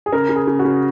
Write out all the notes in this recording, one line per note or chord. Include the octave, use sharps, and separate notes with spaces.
G#4
C#3 A#4
C#3
G#4
C#3
F#4
C#3